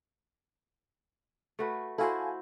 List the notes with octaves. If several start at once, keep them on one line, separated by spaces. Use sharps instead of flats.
A3 F#4 B4
E4 F#4 A4 C5 F5 G#5